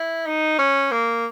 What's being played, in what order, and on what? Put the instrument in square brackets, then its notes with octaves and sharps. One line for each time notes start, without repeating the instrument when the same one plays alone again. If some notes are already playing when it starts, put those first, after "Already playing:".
Already playing: [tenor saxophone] E4
D#4
C#4
A#3